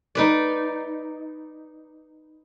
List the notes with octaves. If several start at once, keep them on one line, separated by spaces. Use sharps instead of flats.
D#4 B4 D5